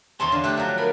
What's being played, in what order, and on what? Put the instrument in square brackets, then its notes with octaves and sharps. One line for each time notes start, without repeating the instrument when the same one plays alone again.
[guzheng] E2 C#5 A5 [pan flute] C6
[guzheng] D3 F5
[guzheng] A3 G4 A5 [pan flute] F#6
[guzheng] F3 F#3
[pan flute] A#4 [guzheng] B5